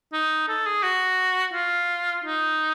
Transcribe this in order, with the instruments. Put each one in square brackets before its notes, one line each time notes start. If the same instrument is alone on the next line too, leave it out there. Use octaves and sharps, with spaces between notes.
[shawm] D#4
A4
G#4
F#4
F4
D#4